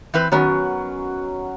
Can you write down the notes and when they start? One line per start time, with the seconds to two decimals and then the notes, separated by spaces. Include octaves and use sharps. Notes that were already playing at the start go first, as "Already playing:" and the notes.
0.14 E3 C4 B4
0.32 D#3 F#3 B3 C#4 F#5